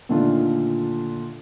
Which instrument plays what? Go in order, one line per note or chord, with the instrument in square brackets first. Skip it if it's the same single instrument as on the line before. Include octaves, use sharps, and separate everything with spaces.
[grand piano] A#2 D3 D#3 A3 D4 F4